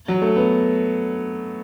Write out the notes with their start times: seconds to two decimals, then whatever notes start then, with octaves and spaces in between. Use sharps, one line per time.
0.08 F#3
0.22 A3
0.36 B3